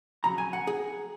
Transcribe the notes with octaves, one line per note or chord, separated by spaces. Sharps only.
F2 C#3 F#3 A#5
G#5
F#5
G#4